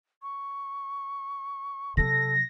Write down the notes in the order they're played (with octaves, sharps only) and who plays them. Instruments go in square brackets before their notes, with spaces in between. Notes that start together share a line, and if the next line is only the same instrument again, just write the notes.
[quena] C#6
[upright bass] C3 F#3 [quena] A4 [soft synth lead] A#6